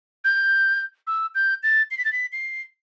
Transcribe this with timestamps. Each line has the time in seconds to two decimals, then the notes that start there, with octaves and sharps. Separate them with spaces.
0.24 G6
1.07 E6
1.35 G6
1.63 A6
1.91 C7
1.98 B6
2.05 A6
2.12 B6
2.33 C7